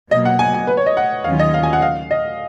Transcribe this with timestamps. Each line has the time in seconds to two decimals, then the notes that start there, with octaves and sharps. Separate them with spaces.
0.11 B2 F#3 A#3 D#5
0.25 F#5
0.39 G#5
0.54 G#5
0.67 B4
0.77 C#5
0.86 D#5
0.97 F#5
1.24 D#2 D#3 F#3 C#4 F4 F5
1.39 D#5
1.54 F5
1.63 G#5
1.73 F#5
1.82 F5
2.11 D#5